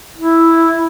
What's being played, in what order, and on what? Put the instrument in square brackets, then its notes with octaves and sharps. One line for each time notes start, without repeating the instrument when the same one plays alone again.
[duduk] E4